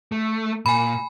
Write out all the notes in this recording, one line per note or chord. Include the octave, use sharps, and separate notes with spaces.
A3
A#2 G#5 B5